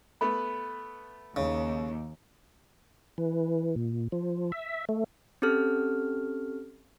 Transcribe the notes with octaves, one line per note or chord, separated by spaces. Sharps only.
A3 B3 B4 B5
D#2 C#3
E3
A#2
F3
E5
A3
C4 C#4 G4 A4 F6